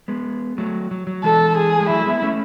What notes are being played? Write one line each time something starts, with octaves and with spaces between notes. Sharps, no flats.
G#3 B3
F#3 A3
F#3
F#3
E3 G#3 A4
G#4
G#3
F#3 A3 E4
G#3 B3
A3 C#4